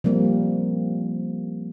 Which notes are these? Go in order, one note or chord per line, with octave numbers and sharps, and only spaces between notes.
F3 G3 A#3 C4